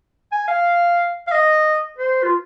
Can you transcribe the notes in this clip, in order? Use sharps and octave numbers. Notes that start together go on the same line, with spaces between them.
G#5
F5
F5
D#5
C5
F4